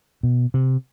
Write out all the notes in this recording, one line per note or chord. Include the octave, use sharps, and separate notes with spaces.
B2
C3